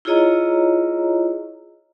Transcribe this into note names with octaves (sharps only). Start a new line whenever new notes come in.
E4 F4 G#4 C#5 D#5 A#5